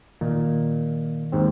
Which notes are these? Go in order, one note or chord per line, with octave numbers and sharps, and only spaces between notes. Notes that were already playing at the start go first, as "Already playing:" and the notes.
A#2 D#3
D#2 G#2 C4